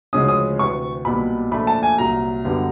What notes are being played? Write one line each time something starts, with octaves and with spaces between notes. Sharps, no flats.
D2 C#3 F3 G#3 C#4 D#6
D#6
D2 C3 E3 C#6
B1 A#2 G3 B5
A#2 F3 A3 D4 B5
A5
G#5
C2 A#2 F#3 A#5
F#2 D3 G3 B3